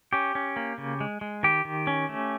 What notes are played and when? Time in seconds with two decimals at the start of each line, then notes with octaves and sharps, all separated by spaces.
0.13 C#4 G4
0.35 C#4
0.56 A#3
0.78 C#3
1.01 G#3
1.21 G#3
1.43 D#3 G4
1.65 D#3
1.87 C#4
2.09 A3